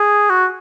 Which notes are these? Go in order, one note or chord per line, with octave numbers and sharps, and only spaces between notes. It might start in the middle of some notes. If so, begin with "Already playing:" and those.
Already playing: G#4
F#4